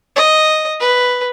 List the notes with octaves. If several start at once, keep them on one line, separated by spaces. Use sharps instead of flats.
D#5
B4